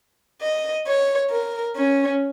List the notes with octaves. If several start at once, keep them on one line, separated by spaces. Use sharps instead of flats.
D#5
C#5
A#4
C#4